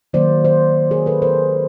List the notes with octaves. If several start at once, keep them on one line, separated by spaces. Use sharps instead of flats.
D#3 F#3 A#3 C5 D5
C5 D5
G#4 A#4
A4 B4
A#4 C5